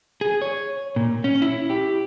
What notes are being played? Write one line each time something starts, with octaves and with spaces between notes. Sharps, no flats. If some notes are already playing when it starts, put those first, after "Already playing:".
G#4
C#5
A#2
C#4
E4
G4